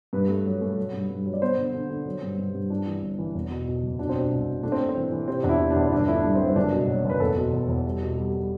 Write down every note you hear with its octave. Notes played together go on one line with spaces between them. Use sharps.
G2 B4
A3
F#3
A3
F#3
G2
G2
F#3
D5
B3 C5
D3
D3
D3
F#3
G2
G2
G2
G2 D4
E3
G1
E3
E2
B2
B2
F#1
B2 D4
C4
B2 D4
C2
B2
A3 D4
C4
A3
C4
E3
E3
C3 C4
E2 D4
E4
C3
D4
E2
E4
G1 D4
A3 E4
D4
G2
C4
G2
C4
F#1 D4
B2
F#3
F#1
B4
E2 A4
B2
E2
E2
G3
B2
G3
G3